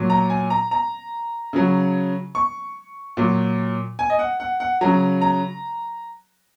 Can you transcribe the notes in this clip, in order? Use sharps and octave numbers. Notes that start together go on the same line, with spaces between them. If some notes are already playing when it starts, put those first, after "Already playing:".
Already playing: A#2 F#3
A#5
G#5
A#5
A#5
C#3 F#3
C#6
A#2 F#3
G#5
D#5
F#5
F#5
F#5
C#3 F#3 A#5
A#5